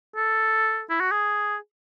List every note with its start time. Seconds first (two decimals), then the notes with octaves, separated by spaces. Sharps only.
0.16 A4
0.90 E4
1.00 F#4
1.11 G#4